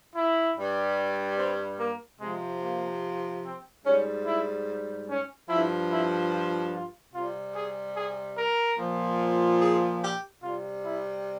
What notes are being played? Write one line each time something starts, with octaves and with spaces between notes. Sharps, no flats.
E4
G2 G3
C4
A#3
C3 F3 G#3
A#3
C4
G#2 G3 C#4
E4
C#4
G2 F3 E4
E4
F4
F4
C3 G3 F4
G#4
G#4
A#4
A#2 F3
G#4
G4
C3 G3 F4
E4